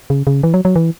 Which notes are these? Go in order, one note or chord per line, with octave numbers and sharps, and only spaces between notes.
C#3
C#3
E3
F#3
F#3
E3